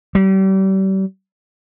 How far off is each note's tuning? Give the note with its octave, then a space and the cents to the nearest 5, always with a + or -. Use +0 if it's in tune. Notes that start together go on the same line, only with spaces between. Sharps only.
G3 -35